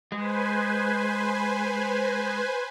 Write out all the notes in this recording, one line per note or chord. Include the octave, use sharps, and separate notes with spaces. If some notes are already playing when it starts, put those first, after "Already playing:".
G#3 B4 C5 G#5